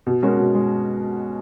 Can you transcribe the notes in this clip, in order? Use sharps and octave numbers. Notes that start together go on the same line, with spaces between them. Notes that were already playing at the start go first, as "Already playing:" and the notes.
B2
G#3 C#4 F#4 A#4
B2
G#3